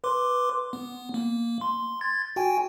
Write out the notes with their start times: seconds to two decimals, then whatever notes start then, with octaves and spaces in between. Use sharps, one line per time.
0.04 B4 C6 D6
0.73 B3
1.14 A#3
1.61 C6
2.01 G#6 A6
2.36 F#4 G5 G#5